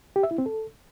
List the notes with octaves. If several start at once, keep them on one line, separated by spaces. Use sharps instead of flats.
G4
E5
E4
C4
A4